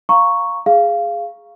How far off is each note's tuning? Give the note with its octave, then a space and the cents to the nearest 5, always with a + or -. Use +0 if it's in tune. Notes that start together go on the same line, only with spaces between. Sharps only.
F5 +0 A#5 +0 C#6 +0
G#4 +0 F5 -15